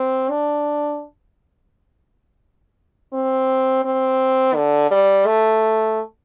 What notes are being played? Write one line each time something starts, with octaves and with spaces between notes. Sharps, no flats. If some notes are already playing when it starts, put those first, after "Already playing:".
Already playing: C4
D4
C4
C4
D3
G3
A3